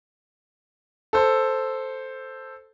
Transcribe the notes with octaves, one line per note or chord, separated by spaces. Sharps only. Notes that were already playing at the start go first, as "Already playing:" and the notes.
A4 C5